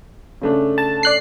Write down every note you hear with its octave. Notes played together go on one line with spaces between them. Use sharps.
C#3 A3 D4
A5
D5 F#6 C7